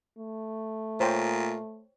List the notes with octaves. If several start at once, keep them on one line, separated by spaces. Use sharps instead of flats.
A3
A#2 C5 C#5 G5